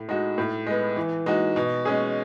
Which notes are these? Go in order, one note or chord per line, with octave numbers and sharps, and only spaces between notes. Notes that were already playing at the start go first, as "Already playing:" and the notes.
Already playing: A2
G#3 D#4 F#4
A2
G#3 B3
E3
G#3 D#4 F#4
B2
G#3 C#4 G#4